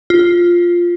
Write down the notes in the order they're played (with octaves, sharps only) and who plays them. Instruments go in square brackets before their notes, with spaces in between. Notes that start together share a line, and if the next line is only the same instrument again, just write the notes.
[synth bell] F4